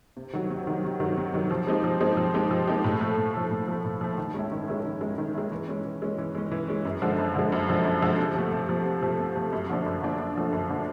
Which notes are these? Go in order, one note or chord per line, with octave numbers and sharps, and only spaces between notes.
C3
D#3 F#3
C3
D#3 F#3
C3
D#3 F#3
C3
D#3 F#3
F3
G#3 C4 D#4 G4
F3
G#3 C4 D#4 G4
F3
G#3 C4 D#4 G4
F3
G#3 C4 D#4 G4
A2
F3 A3
A2
F3 A3
A2
F3 A3
A2
F3 A3
D#3
G#3 C#4 E4
D#3
G#3 C#4 E4
D#3
G#3 C#4 E4
D#3
G#3 C#4 E4
E3
G#3 C#4
E3
G#3 C#4
E3
G#3 C#4
E3
G#3 C#4
F#2
D3 F3 G#3
F#2
D3 F3 G#3
F#2
D3 F3 G#3
F#2
D3 F3 G#3
C3
F3 A3
C3
F3 A3
C3
F3 A3
C3
F3 A3
F#2
D3 F3 A3 D4
F#2
D3 F3 A3 D4
F#2
D3 F3 A3 D4
F#2
D3 F3 A3 D4